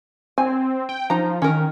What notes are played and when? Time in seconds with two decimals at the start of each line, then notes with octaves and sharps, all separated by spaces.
0.38 C4 G#5
0.89 G5
1.10 F3 D#4 A#5
1.42 D#3 C#4 A#4